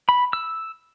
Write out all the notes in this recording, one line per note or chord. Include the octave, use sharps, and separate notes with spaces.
B5
E6